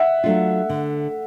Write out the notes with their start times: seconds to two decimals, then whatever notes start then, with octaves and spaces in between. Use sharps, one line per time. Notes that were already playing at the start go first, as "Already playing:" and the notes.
Already playing: E5 F#5
0.24 F#3 A3 D4 F4
0.69 D3